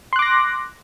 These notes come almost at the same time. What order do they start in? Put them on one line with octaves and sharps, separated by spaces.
C6 F#6 D6 A#6